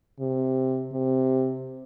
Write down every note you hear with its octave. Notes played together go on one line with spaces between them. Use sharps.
C3
C3